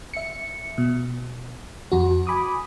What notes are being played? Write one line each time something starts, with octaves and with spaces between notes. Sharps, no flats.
E5 C#7
B2
F2 F#4
G#5 B5 D6 D#6